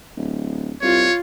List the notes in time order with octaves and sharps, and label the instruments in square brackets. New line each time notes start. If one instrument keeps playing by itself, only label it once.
[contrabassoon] D1
[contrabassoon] C2 [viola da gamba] F4 [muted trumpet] C#5